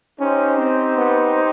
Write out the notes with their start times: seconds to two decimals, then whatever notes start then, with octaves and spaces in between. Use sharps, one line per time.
0.20 C#4 D#4 G4 C5
0.58 C4
0.98 B3